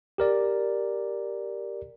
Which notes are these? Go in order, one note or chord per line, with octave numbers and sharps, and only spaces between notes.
G4 A#4 D5